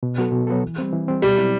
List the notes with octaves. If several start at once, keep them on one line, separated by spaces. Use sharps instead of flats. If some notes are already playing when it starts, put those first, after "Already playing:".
B2
F#3 B3 F#4 A4
B2
F#3 B3 F#4 A4
E3
G3 C4
E3
G3 C4
B2 G3
F#3 C4 E4